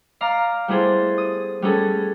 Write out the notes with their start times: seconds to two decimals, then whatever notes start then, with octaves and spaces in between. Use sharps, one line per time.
0.21 D5 F5 A#5
0.68 G3 B3 E4 G#4 A4 C5
1.18 D#6
1.62 G3 B3 C#4 G#4 A4